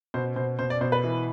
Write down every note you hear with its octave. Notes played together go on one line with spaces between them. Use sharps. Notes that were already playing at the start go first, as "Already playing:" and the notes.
B2 C5
B2 C5
B2 C5
D5
B2 C5
B4
E3